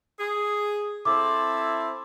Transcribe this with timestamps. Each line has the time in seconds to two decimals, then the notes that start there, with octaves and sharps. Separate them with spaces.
0.19 G#4
1.05 C4 E4 A4 D6